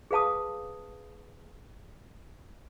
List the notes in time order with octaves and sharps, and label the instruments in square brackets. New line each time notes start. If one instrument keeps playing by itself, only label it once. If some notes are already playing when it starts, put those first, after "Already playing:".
[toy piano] G#4 B4 F5 A5 D#6